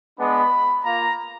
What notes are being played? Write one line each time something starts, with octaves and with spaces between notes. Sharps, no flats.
G#3 B3 D4 B5
A#3 F4 A#5